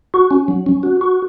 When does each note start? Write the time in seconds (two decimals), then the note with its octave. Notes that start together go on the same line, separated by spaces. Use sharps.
0.14 F#4
0.31 C#4
0.48 F#3
0.66 C#4
0.83 F#4
1.01 F#4